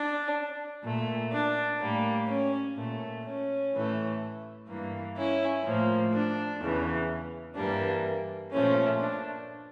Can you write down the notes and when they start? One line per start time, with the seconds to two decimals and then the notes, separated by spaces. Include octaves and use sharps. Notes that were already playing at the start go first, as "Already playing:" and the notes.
Already playing: D4
0.84 A#2 A3
1.31 D4
1.80 A2 G3 A#3
2.28 C#4
2.76 A#2 A3
3.24 C#4
3.72 A2 E3 A3
4.68 G2 E3 A#3
5.16 C#4 E4
5.64 A2 F3 A#3
6.12 D4
6.60 E2 C#3 E3
7.56 G2 E3 G3 A#3 D4
8.52 A#2 F3 A3 C#4
9.00 D4